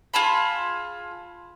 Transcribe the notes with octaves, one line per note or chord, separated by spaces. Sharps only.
F4 G#4 A5 B5